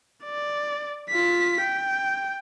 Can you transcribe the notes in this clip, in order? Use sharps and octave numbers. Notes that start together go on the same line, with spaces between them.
D5
F4 B6
G5